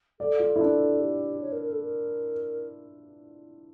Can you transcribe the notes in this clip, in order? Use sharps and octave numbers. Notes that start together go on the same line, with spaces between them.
A4 D5
F4
E4
D4
G4
C#5
A#4
A#4
A4
A#4